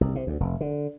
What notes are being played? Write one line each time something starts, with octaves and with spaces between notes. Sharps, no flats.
C2
C3
D2
F1
D3